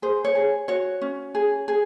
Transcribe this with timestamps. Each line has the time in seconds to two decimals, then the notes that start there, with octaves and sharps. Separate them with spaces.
0.02 G#4 C5
0.25 C#5
0.35 G#4
0.68 F#4 C#5
1.02 C#4
1.35 G#4
1.68 G#4